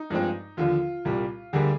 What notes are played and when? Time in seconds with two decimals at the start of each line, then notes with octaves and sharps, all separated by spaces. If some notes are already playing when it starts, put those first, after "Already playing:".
Already playing: D#4
0.10 G2 F3 G#3 C4
0.57 D#2 D3 F3 F4
1.05 C2 A#2 G3
1.53 D2 D3 G3 A#3 G#4